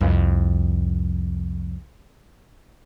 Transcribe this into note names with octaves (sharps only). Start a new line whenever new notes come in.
C2 F2